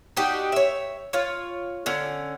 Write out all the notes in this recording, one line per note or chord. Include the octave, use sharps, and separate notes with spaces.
D4 D#4 F#4 G4
C#5 E5
F4 C#5
D3 C#4